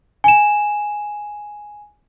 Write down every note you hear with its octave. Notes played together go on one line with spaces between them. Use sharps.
G#5 E7